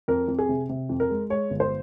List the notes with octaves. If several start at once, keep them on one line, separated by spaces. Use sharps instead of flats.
F2 A#4
F2
G#4
C3
C3
F2
A#4
G#3
G#3 C#5
G1
C5